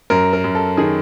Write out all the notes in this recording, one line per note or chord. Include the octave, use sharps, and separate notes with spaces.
F#2 A#4
A#4
F#2
A4
D#3 G#4